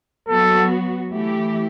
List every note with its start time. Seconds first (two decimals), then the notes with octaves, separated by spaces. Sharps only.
0.28 F#3 B3 F#4 A4
1.11 E3 A3 E4 G4